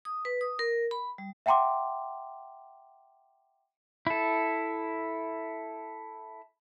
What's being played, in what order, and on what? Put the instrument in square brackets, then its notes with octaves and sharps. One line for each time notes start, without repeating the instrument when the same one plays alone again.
[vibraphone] D#6
B4
D#6
A#4
B5
G3
[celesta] E5 F#5 G5 A#5 C6 D6
[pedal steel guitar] E4 A4